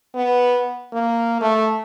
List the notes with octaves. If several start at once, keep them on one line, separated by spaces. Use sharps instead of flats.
B3
A#3
A3